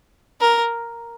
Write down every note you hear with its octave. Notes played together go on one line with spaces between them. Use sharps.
A#4